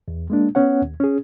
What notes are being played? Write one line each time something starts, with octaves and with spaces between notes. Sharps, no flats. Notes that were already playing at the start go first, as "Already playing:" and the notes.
E2
G#3 A#3 D4
B3 C#4 C#5 F#5
D#2
C#4 G#4